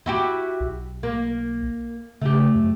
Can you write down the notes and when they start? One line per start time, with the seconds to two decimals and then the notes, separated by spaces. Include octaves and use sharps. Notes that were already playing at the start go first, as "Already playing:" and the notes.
0.06 E4 F#4 G4
0.60 B1
1.03 A#3
2.21 C#3 A3 G4
2.55 F#2